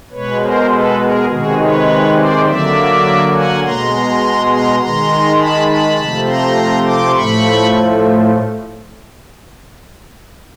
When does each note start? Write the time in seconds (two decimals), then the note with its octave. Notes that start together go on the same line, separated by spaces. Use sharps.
0.11 B2 G#3 B4 C#5
0.40 A#4 C5
0.69 A4 B4
0.99 G#4 A#4
1.28 C3 D#3 G#3 F#4 G#4
1.58 B4 C#5
2.16 C5 D5
2.45 D3 F#3 A#3 D5 E5
3.33 F#5 G#5
3.63 B2 G#3 A#5 C6
4.50 A#5 C6
4.79 D#3 G#3 A#5 C6
5.38 A5 B5
5.67 A5 B5
5.97 C3 F3 A3
6.26 A#5 C6
6.85 C6 D6
7.14 A2 F3 A3 B5 C#6